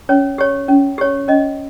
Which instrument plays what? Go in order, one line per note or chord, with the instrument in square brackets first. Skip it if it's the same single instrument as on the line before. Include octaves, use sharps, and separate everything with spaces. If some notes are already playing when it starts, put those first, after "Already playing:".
[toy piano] C#4 C#5
G4 C#5
C#4
G4 C#5
C#4 D#5